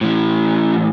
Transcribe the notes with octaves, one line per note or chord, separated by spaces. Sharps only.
A2 E3